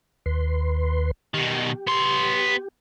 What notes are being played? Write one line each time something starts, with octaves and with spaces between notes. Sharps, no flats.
D#2 B4 C6
B2 D#3 G4
B3 C6